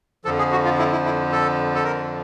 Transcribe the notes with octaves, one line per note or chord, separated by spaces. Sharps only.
F2 D3 F3 A4
G#4
F#4
F4
E4
E4
E4
A4
A4
A#4